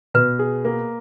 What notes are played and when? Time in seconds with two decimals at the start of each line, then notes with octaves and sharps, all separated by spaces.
0.14 B2 B4
0.39 G#4
0.65 A#3